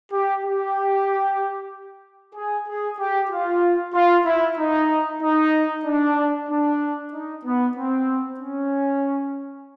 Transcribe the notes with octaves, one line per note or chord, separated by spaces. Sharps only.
G4
G4
G#4
G#4
G4
F4
F4
E4
D#4
D#4
D4
D4
D#4
B3
C4
C#4